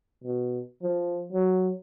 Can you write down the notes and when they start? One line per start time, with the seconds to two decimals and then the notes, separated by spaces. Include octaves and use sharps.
0.24 B2
0.83 F3
1.32 F#3